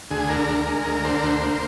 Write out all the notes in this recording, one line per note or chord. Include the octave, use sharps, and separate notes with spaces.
D2 G#4
D3 A#4
D2
G#3
D2
D3 C5
A#4
D2 C5
A#3